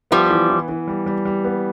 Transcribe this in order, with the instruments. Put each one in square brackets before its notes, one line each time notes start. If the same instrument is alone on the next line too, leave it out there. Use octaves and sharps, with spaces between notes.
[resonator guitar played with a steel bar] F3 G3 [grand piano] B3
[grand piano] E3
E3
E3
G3
G3
G3
B3